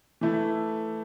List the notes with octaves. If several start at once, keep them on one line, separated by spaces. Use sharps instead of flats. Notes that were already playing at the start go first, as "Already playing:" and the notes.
E3 A3 E4